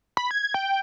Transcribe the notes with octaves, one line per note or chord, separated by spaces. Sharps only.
B5
G#6
G5